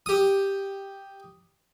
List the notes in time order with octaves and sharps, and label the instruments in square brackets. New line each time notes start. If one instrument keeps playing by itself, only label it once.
[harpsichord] G4 D#6